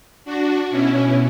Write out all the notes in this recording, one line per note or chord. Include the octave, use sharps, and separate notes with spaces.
D4 F#4
B2 C#4 E4